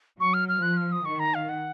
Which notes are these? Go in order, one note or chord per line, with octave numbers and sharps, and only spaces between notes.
F#3 C#6
F6
F6
F3 F#6
F6
D#6
D#3 C#6
A#5
F5
F#5